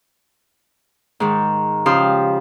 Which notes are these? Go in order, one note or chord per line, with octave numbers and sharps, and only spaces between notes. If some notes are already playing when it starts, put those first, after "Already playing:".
G#2 D#3
C#3 F3 G4 C6 D#6 F6